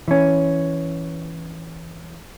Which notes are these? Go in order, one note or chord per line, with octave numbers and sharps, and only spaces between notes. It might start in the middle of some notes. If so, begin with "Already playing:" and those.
E3 C#4